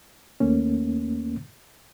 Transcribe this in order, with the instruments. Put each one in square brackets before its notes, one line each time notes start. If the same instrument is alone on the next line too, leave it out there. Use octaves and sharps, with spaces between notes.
[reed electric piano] D#2 A3 A#3 C#4